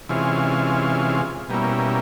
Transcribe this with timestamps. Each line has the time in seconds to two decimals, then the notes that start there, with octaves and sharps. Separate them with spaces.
0.09 C3 E3 G#3 C#4 F4
1.49 B2 G3 A#3 C#4 E4